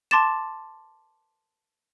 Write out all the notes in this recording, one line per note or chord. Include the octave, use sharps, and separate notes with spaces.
A5 C6 D6 A6 E7